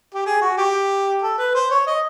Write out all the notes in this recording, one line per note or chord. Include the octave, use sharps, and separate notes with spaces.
G4
G#4
F#4
G4
A4
B4
C5
C#5
D#5